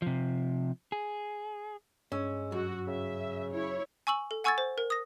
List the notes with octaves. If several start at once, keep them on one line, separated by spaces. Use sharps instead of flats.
C3 F3
G#4
G2 G#3 C#4 E6
F#2 F#4
C#3 E5
E4 C#5
G#5 C#6 E6 F#7
A4
F#5 G#5 C#6 E6 G#6 A6
C5
A#4
D#6 A#6